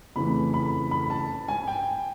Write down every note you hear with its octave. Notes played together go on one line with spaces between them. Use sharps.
F2 C#3 E3 A3 B5
B5
B5
A5
G#5
G5